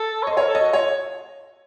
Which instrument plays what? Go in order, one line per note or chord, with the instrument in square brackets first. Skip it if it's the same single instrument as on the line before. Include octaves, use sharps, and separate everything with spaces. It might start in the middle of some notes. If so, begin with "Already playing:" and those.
Already playing: [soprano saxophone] A4
C#5
[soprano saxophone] C5 [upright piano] D#5
[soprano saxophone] A#4 [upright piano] C#5
[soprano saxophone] A4
[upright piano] D#5
[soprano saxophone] F#4
[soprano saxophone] F4 [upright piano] C#5